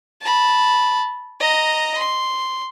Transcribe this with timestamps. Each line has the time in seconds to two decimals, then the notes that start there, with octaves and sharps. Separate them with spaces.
0.22 A5 B5
1.40 D#5 A#5
1.98 C6